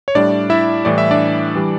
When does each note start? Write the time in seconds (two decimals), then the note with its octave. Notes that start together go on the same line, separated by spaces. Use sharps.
0.08 C#5
0.15 A2 G3 D4 D5
0.50 E4 E5
0.85 A2 E3 G3 D5
0.98 E5
1.11 D4 D5
1.56 E3 G3